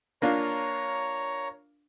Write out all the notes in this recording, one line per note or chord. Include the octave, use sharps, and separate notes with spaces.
A#3 D4 F4 C#5 A#5